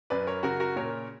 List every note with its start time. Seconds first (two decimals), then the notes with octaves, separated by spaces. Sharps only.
0.10 F#2 B4 D5
0.27 A#4 C#5
0.43 C#3 F#4 A#4
0.60 F#4 A#4
0.76 A#2 A#4 C#5